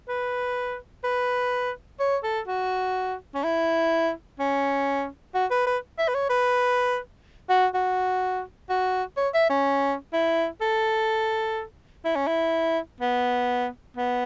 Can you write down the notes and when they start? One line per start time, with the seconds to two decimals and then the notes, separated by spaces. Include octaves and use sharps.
0.08 B4
1.04 B4
2.00 C#5
2.23 A4
2.48 F#4
3.34 C#4
3.44 E4
4.39 C#4
5.34 F#4
5.51 B4
5.66 B4
5.98 E5
6.08 B4
6.15 C#5
6.30 B4
7.49 F#4
7.74 F#4
8.69 F#4
9.17 C#5
9.34 E5
9.49 C#4
10.13 E4
10.61 A4
12.05 E4
12.15 C#4
12.27 E4
13.00 B3
13.97 B3